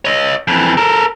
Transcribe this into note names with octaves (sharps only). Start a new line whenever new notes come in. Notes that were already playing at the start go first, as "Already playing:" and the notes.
C#5 D#5
F2 E3
A4 A#4